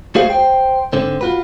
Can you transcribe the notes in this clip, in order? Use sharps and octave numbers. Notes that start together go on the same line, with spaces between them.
A3 F#4 G#4 C5 F5
C5 G5
G#2 D3 C4
F4 F#4 B4